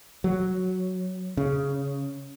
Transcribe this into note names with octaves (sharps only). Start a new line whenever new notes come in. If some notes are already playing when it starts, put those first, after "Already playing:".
F#3
C#3